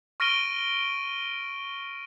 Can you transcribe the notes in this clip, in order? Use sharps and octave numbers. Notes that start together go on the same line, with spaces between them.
C#6 F6 A#6 D7 D#7 G7